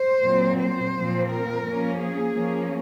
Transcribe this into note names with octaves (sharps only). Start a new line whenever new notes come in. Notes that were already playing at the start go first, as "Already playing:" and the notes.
Already playing: C5
A#2 F#3 C4
C5
A#2 F3 C4
A#4
F3 A#3 C#4
G#4
F3 A#3 C#4